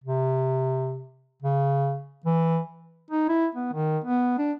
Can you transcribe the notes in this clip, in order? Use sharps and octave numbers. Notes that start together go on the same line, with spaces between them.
C3
C#3
E3
D#4
E4
B3
D#3
B3
D4